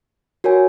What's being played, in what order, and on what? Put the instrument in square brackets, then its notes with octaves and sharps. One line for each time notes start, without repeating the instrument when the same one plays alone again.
[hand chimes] F#4 A#4 C#5 G#5